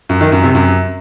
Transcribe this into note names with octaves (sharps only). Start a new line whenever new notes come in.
F#2
D#3
F#2
C3
F#2